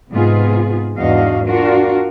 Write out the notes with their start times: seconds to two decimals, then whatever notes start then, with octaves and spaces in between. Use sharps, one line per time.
0.11 G#2 C3 B3 D#4 F4 G#4
0.97 E2 G#2 D4 F#4 D#5 F5
1.46 D4 F4 F#4 A#4